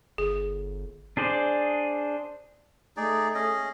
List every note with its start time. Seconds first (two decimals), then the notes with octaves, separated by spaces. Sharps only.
0.18 G1 G#4
1.17 D4 G#4 C5 D5
2.97 A3 D#4 G#4 D5
3.35 C#4 G#4 D#5